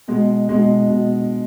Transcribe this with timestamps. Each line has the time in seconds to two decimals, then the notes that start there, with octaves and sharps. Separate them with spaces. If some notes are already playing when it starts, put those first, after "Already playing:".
0.08 B2 G#3
0.49 B2 G#3
0.89 B2